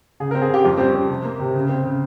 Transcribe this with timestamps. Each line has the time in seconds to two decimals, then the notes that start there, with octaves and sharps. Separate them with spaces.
0.20 C#3 G#4
0.31 A#4
0.35 C4
0.42 G#4
0.49 C#3 G4
0.65 F2 F4
0.77 G3 C4
0.87 C#4
0.95 C4
1.09 C3
1.24 A#3
1.40 C3
1.54 C#3
1.69 C4
1.85 C#3